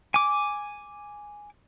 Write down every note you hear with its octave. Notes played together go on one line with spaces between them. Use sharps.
G#5 D6